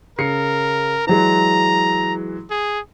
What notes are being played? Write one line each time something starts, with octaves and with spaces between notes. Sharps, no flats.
C#3 A#4 C7 C#7
E3 F#3 G#3 A#5
G#4